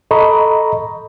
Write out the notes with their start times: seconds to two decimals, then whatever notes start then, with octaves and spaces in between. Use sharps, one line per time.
0.11 A4 D#5 A#5 B5 C#6